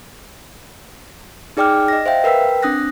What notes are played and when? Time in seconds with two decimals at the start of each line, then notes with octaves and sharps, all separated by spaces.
1.57 D#4 G#4 D5 G5 D6 F6
1.88 D#5 A#6
2.06 C5 E5 F5 G5
2.24 A#4 B4 G5 E6 B6
2.63 C4 D4 D#6 F#6 A#6